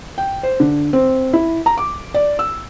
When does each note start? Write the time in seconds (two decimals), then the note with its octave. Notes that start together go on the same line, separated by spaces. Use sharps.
0.18 G5
0.43 C5
0.60 D3
0.93 C4
1.33 E4
1.66 A#5
1.78 D6
2.14 D5
2.39 E6